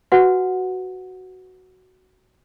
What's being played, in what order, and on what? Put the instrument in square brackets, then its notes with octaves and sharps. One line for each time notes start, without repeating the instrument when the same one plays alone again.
[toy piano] F#4 B4 F#5 G#5